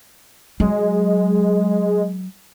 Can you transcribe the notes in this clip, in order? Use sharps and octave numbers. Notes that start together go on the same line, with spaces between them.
F#3 G#3